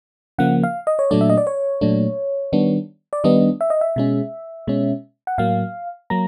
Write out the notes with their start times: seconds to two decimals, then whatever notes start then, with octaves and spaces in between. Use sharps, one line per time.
0.38 C#3 F3 A#3 F#5
0.63 F5
0.87 D#5
0.99 C#5
1.11 A#2 F#3 A3 D4 D5
1.21 E5
1.30 D#5
1.37 D5
1.47 C#5
1.81 A#2 F#3 A3 D4
2.53 D#3 G3 B3 D4
3.13 D5
3.24 D#3 G3 B3 D4 D#5
3.61 E5
3.70 D#5
3.81 E5
3.96 B2 G#3 C#4
4.67 B2 G#3 C#4
5.27 F#5
5.38 A2 F#3 A#3 F5
6.10 F#3 A#3 A#5